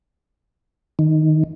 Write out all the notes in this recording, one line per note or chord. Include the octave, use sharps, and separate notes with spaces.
D#3